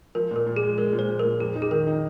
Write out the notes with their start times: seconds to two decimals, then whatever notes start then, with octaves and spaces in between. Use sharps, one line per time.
0.15 F3 A#4
0.31 A#2 A#4
0.47 A#2
0.56 G#4
0.63 G#3
0.78 G#3 A#4
0.93 A#2
0.99 C5
1.08 F3
1.19 A#4
1.25 A#2
1.40 F2 G#4
1.55 D#4
1.62 G#4
1.71 D#3 A#4
1.87 D#4